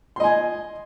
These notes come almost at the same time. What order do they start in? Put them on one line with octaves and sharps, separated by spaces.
C6 D#5 G#5